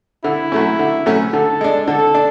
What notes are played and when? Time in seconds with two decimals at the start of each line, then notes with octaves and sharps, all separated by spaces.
0.24 D3 E4
0.52 F#3 A3 C#4
0.79 D3
1.06 F#3 A3 C#4
1.33 D3 A4
1.61 G#3 D4
1.87 D3 A4
2.14 D4